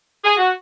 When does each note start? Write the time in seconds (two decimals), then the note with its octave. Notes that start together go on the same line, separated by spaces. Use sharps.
0.23 G#4
0.37 F#4